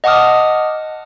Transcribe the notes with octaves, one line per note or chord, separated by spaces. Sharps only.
D#5 F#5 A5 D6 D#6 F6